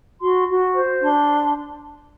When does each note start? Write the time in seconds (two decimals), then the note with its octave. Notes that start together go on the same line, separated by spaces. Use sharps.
0.22 F#4 C6
0.49 F#4
0.75 C5
1.02 D4 C6